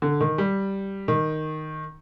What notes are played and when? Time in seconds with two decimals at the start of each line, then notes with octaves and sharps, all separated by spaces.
0.02 D3
0.21 D#3
0.38 G3
1.08 D#3